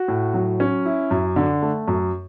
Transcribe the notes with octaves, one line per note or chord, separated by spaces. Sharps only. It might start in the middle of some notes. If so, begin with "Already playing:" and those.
Already playing: F#4
A2
F#3
C#4
E4
F#2
D3
A3
F#2